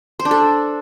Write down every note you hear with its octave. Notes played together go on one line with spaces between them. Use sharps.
C5
D4
A4